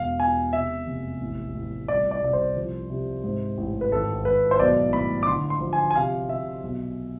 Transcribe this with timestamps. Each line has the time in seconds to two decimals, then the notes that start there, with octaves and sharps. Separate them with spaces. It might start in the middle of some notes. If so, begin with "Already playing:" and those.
Already playing: E1 F5
0.20 E2 G#5
0.53 C3 E5
0.87 F1
1.21 A1
1.55 A1
1.88 C2 D5
2.11 D5
2.23 C2 D5
2.33 C5
2.57 F3
2.90 C3
3.24 G#2
3.58 A1
3.81 B4
3.92 G#1 A4
4.25 G#1 B4
4.51 C5
4.59 B1 D5
4.93 A2 B5
5.23 D6
5.27 D3 C6
5.50 C6
5.61 F3
5.73 G#5
5.91 G#5
5.96 C3 F5
6.29 C3 E5
6.63 B1